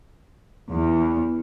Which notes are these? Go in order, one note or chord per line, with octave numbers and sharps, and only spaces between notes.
E2